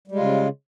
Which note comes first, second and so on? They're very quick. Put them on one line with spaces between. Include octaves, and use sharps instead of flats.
G3 G#3 F4 C#3